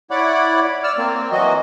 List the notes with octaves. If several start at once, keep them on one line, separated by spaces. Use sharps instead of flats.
E4 C#5 D5 F#5 B5 D6
D5 E6 F6
A#3 C4
E3 F#3 F#4 D#5